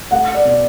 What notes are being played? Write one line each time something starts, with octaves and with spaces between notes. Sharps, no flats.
A3 F#5
D5
B2